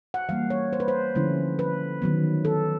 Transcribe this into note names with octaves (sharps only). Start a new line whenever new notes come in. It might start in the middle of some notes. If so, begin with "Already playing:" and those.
F#5
E3 G3 A#3 F5
C#5
C5
B4
C5
D3 F3 A3 C#4 E4
B4
D#3 F#3 B3
A4